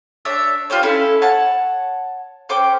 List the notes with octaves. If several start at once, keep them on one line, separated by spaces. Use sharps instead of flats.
D4 C#5 E5
F4 G4 C5 C#5
C#4 E4 A4 F5
C#5 F#5 A5
C#4 C5 G5 D6